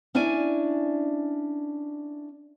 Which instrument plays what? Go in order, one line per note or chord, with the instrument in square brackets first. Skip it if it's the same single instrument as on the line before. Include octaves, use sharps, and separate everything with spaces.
[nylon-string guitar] C#4 D4 E4 D5 G#5